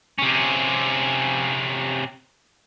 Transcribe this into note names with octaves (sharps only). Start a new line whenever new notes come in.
C3 C#4